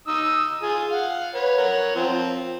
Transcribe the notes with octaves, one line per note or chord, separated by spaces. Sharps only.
D#4 D#6 E6
F4 G#4
F5 F#5
B4 C#5
A#4 C#5 F#5
F3 C4